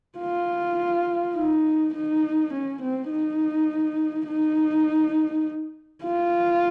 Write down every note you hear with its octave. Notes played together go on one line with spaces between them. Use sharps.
F4
D#4
D#4
C#4
C4
D#4
D#4
F4